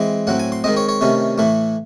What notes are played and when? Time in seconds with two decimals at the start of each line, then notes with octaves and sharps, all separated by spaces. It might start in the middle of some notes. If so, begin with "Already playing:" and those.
Already playing: E3 G#3 C4
0.27 A2 F#3 C4 F#5
0.39 G#5
0.52 C6
0.64 D#3 G#3 C4 D#5
0.77 C#5
0.89 C#5
1.01 C3 D#3 A3 C#4
1.38 A2 E3 A3